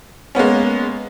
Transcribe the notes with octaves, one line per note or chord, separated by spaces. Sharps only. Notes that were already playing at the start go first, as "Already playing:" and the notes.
G#3 A#3 B3 C#4